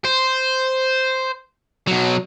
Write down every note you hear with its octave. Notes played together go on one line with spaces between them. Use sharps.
C5
B2 F#3